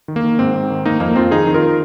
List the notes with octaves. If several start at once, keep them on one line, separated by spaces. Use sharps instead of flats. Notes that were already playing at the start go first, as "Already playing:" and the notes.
D#3
A#3
D#3
G#2 C4
G#2
D#3
D#3 A#3 D#4
F2 A#3 D#4
F2 C4 F4
D#3 D#4 G#4
D#3
F4 A#4